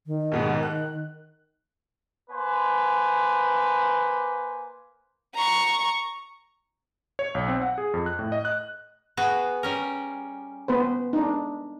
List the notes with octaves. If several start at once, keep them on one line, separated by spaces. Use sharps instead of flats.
D#3
D#2 G#2 B2
F#6
A#3 B4 C5 G#5
A#5 C#6
C#5
B1
C4
F#5
G#4
F2
F#6
A2
D#5
F#6
B3 F#4 G#4
G3 C#4 A#4
B3 B4 C5
D4 D#4